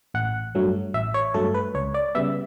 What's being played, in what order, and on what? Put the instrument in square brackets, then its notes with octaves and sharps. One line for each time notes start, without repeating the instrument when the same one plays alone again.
[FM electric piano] A1 F#5
G2 F#3 A3
A1 E5
C#5
G2 F#3 A3 A4
B4
C#2 C#5
D5
C#3 G3 B3 E5